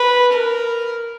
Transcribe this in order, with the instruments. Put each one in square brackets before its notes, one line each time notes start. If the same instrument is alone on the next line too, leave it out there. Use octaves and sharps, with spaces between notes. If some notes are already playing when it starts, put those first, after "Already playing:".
Already playing: [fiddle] B4
A#4